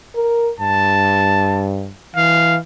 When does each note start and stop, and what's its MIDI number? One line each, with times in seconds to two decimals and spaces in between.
0.16 0.51 70
0.60 1.92 43
0.60 1.69 81
2.16 2.59 52
2.16 2.57 77